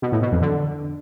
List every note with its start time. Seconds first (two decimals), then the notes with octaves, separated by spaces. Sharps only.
0.02 B2
0.12 A2
0.22 B2
0.32 F2
0.42 D3